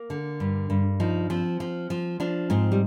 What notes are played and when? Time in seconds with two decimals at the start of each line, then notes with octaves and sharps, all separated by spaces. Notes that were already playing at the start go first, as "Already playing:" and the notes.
Already playing: A#3
0.10 D3
0.40 G2
0.70 G2
1.00 F3 D#4
1.30 F3 C4
1.60 F3
1.90 F3
2.20 F3 D4
2.50 G#2 C4
2.72 G3